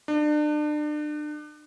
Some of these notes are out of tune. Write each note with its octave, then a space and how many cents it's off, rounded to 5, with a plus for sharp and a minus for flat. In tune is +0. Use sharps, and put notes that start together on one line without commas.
D4 +35